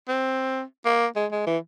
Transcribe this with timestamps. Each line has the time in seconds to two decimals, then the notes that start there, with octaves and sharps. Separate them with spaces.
0.08 C4
0.85 A#3
1.16 G#3
1.32 G#3
1.47 E3